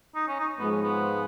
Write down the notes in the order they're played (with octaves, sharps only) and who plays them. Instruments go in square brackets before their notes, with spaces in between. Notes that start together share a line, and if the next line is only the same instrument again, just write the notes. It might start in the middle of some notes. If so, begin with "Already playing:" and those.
[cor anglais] D#4
C#4
D#4
[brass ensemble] G#2 F3 G#3 [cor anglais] B3
[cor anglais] C#4
B3